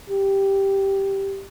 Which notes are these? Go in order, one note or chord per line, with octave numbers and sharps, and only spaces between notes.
G4